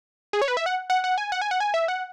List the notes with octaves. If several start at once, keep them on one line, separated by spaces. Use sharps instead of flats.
G#4
C#5
B4
E5
F#5
F#5
F#5
G#5
F#5
G#5
F#5
G#5
E5
F#5